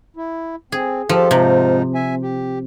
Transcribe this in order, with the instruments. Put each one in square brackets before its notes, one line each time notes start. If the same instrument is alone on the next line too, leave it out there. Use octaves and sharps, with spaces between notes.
[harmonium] E4
[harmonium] C4 [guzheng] G#4
[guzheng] F3 [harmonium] G4 A4
[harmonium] G#2 F3 D#4 [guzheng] C3
[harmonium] E5 G#5
G4